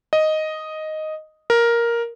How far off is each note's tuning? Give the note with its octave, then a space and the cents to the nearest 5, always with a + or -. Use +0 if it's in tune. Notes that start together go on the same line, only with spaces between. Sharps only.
D#5 +0
A#4 +5